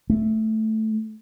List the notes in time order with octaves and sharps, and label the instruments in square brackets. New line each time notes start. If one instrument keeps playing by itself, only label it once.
[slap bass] A3